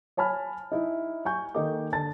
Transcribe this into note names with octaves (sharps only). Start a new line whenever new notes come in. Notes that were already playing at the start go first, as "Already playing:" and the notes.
C#5 G#5 A5 B5 F6
D#4 E4
G#5 C#6 G6
D#3 A#3 D#4 A4 A#4 D6
D3 A5 A6